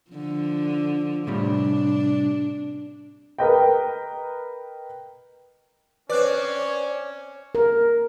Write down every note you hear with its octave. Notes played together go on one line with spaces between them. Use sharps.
D3 F3
A2 C3 G3 D4
A#4 B4 D#5 G5
C4 C#4 B4 C#5 D5 F#6
A#4